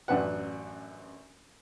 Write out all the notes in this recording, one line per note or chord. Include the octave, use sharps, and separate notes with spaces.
A1 F#2 D4 B4 F#5